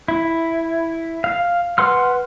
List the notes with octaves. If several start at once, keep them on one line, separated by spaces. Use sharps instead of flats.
E4
F5
B4 F#5 C6 F6